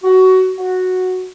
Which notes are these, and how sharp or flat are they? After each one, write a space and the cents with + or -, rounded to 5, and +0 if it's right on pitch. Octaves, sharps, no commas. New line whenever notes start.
F#4 +20
F#4 -5